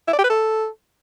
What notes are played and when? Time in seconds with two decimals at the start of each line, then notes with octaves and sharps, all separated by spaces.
0.08 E4
0.13 D5
0.19 G4
0.24 B4
0.30 A4